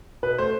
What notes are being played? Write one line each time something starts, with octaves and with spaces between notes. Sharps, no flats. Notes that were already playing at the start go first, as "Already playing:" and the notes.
B2 B4
A3 C5